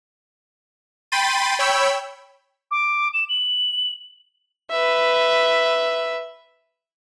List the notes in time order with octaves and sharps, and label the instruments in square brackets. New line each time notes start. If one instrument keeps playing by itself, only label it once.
[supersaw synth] G5 B5 C6 A6 D#7
C#5 G5 B5 E6
[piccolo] D6
E7
F#7
[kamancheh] B4 E5